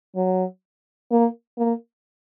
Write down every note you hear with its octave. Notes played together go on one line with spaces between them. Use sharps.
F#3
A#3
A#3